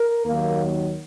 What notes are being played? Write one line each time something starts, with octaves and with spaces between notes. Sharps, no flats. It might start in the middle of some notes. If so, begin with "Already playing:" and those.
Already playing: A#4
D#2 D#3 F#3 A#3